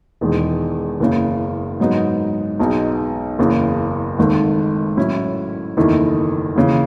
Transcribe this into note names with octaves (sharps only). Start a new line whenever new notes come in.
E1 E2 D#3 G#3
F#1 E2 C#3
G#2 F#3 B3 D#4
B1 B2 G#3 D#4
F#1 E2 C#3
G#1 G#2 D#3 A3
A2 F#3 C#4 E4
F#1 E2 D#3 A3 E4
D#2 C#3 E3